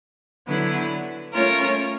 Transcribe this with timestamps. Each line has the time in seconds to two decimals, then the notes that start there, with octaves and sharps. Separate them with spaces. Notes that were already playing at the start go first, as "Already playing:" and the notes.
0.47 D3 F#3 B3 E4
1.33 A3 C#4 F4 A#4 C#5